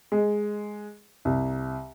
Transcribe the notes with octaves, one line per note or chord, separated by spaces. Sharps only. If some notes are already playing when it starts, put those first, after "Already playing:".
G#3
C2